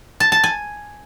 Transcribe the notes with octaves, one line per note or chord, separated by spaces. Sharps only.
A5
A5
G#5